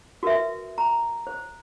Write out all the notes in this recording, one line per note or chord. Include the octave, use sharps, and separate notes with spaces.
F#4 A#4 B4 E5
A#5
C5